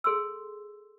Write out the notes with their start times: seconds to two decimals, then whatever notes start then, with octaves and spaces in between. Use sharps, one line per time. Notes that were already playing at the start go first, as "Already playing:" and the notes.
0.04 G#4 A4 C6 E6